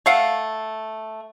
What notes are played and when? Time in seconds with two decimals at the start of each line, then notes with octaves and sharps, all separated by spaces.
0.06 A3 F5 F#5